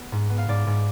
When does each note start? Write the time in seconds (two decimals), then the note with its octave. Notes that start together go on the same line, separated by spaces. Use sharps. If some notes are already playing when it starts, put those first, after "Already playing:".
Already playing: B3
0.12 G#2
0.30 B3
0.38 F5
0.48 G#2 D5
0.67 G#2